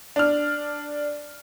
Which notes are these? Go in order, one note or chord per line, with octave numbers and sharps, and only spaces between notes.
D4 F6